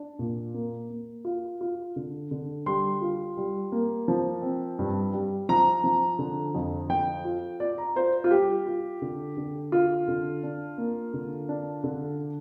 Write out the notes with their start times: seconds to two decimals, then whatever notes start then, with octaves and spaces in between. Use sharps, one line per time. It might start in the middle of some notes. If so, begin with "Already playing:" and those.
Already playing: D4
0.19 A#2
0.54 A#3
0.90 A#3
1.25 F4
1.61 F4
1.96 D3
2.31 D3
2.66 G3 C6
3.01 F4
3.37 G3
3.72 A#3
4.08 F3
4.42 C4
4.79 G2
5.13 G3
5.49 F3 A#5
5.84 F3
6.19 D3
6.55 F2
6.89 F3 G5
7.25 F4
7.60 F4 D5
7.78 A#5
7.96 F4 C5
8.24 F4
8.31 G3 G4
8.66 F4
9.02 D3
9.37 D3
9.72 F4
10.08 D3
10.43 D4
10.78 A#3
11.14 D3
11.49 D4
11.84 D3